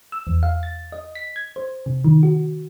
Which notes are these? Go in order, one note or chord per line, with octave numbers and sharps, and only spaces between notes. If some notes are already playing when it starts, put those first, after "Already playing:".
E6
E2
F5
A6
D#5
B6
G#6
C5
C3
D#3
F#4